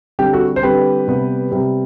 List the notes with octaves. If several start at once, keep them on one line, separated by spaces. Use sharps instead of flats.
D3 G3 C4 G4
F#4 A4
C5
D3 G3 C4 G4 B4
C3 G3 B3
C3 G3 B3